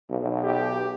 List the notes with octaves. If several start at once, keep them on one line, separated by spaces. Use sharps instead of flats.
B1
G4